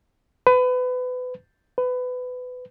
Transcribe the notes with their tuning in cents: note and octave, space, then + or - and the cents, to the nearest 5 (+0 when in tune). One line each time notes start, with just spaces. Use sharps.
B4 +30
B4 +25